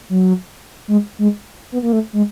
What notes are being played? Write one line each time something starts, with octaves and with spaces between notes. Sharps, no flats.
F#3
G#3
G#3
B3
A#3
A3
G#3